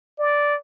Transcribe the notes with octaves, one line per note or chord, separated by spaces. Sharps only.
D5